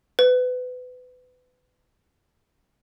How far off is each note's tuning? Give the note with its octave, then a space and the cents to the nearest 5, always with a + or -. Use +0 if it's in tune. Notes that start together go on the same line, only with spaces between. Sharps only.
B4 +25